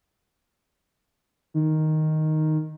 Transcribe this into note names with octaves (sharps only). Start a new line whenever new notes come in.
D#3